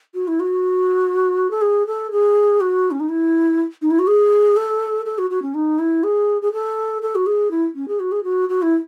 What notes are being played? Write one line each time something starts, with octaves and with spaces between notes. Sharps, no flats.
F#4
E4
F#4
A4
G#4
A4
G#4
F#4
C#4
D#4
E4
D#4
E4
F#4
G#4
A4
A4
F#4
F#4
C#4
D#4
E4
G#4
G#4
A4
A4
F#4
G#4
E4
C#4
G#4
F#4
G#4
F#4
F#4
E4